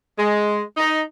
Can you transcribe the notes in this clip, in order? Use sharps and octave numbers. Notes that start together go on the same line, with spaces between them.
G#3
D#4